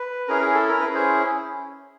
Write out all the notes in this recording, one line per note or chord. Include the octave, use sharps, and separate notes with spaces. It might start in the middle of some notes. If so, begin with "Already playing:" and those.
Already playing: B4
C#4 E4 G#4 A#4
G#4
A4
A#4
C#4 E4 G#4 B4
C5